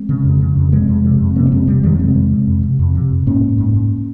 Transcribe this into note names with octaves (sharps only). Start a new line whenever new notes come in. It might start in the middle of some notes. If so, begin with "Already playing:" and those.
Already playing: G#3 C4
C#3
F2
C#3
F2
C3 G#3 C4
F2
C3
F2
C3 A#3 C#4
C#4
F2 G#3 C4
C3 G3 A#3
F2 D#3 G3
C3 G#3 C4
F2
C3
F2
C3
F2
C3
F2
G#2 A#3 C#4
G#2
G#2
G#2